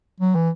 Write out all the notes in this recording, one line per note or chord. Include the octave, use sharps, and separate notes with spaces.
F#3
E3